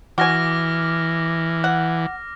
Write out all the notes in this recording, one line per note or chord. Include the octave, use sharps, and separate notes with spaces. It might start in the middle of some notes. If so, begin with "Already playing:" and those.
E3 F#4 G#5 D6 F6 A#6
F#5